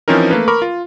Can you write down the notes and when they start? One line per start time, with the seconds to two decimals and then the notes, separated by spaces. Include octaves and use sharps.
0.08 E3 F3 C4 C#4 D#4 A#4
0.31 A3 A#3 B4
0.48 A#4 B5 C#6 D6
0.62 F4